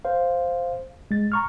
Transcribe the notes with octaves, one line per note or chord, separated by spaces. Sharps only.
C5 F5
G#3 A6
A#5 C#6 F6